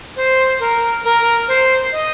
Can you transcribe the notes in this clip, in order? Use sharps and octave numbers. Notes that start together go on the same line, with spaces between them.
C5
A#4
A#4
C5
D#5